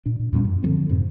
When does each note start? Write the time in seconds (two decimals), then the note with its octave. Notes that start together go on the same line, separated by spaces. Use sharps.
0.06 A#2 D4
0.20 A#2
0.33 E2 A#2 G3 C#4
0.45 F#2
0.63 D3 F3 F#3 C4
0.89 F2 G#2 C3